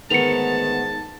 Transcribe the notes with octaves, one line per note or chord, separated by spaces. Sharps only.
D2 G#2 D#3 B3 A5 C#7 F7